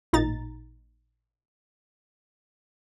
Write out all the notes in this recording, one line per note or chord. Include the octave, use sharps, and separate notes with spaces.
A1 A#2 D#4 A#5 A6